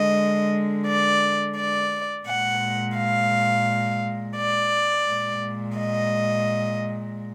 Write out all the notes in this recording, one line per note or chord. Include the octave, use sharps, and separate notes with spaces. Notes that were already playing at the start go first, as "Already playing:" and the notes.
Already playing: D3 G#3 D#5
D5
D5
A#2 G#3 F#5
F5
D5
A#2 G#3
D#5